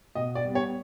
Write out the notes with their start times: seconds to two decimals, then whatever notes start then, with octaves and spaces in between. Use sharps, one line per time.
0.15 B2 D#5
0.35 D5
0.45 G3 B3
0.55 C#5